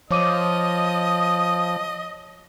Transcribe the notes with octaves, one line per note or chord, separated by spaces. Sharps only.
F3 C#5 D#5 D6 D#6 D#7